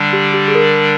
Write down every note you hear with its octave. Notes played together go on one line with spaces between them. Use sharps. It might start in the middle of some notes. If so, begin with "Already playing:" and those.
Already playing: D3 G3 D4
G4
G4
G#4
A#4